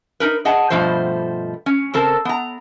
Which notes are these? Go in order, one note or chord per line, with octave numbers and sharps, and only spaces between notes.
D#4 A#4 B4
G#4 D#5 F#5 A5
G2 B2 F3 A3 C5
C#4
C#3 C4 A4 A#4 A5
B3 A#5